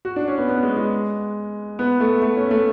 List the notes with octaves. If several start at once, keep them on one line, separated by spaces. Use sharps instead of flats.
F#4
D4
C#4
B3
B3
G#3
G#3
B3
A3
A3
C#4
A3